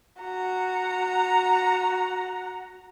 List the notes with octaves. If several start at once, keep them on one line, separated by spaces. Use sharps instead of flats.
F#4 A#5